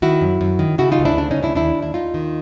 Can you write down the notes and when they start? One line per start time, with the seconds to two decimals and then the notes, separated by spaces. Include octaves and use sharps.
0.02 D#3 E4 F#4
0.21 F#2
0.41 F#2
0.59 D#3
0.78 C#3 E4 F#4
0.92 D#4 F4
0.99 D2
1.05 D4 E4
1.17 C#3 D4
1.31 C#4 D#4
1.36 D2
1.43 D4 E4
1.55 D#2 D4 E4
1.75 D#2
1.82 E4
1.94 D#2 D#4 F4
2.14 D#3